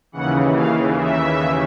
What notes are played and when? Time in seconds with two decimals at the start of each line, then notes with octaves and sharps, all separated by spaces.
0.12 D#2 C#3 E3 F#5
0.54 F5
0.98 E5